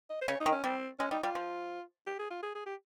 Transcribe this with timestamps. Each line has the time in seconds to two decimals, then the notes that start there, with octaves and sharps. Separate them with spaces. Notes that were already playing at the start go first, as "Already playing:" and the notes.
0.10 D#5
0.22 C5
0.28 C#3 C#5
0.40 D#4
0.46 D#3
0.52 C#4
0.64 G3 C4
0.99 G#3 C#4
1.11 G3 D#4
1.23 G3 F4
1.35 F3
2.07 G4
2.19 G#4
2.31 F4
2.43 G#4
2.55 G#4
2.66 G4